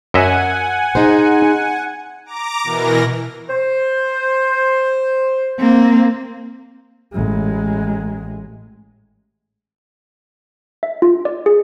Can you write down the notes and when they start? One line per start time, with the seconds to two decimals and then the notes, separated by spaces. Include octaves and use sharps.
0.14 F#2 D#5 E5 F#5 G#5
0.95 D#4 G#4 C5
2.26 A#5 D6
2.63 B2 E3 A#4 A#6
3.50 C5
5.59 A#3 C4
7.13 A1 G#3
10.83 E5
11.02 F4
11.25 D5
11.46 G#4